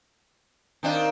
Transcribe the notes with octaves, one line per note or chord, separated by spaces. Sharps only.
D#3 C4 D4 D#4 F4 A#4